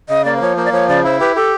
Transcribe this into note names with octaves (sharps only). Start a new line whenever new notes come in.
C#3 D#5
A#3 D5
C5
F3 C#5
A#3 C5
D5
F3 C#5
C#3 D5
E4 C5
G4 B4
G4 A4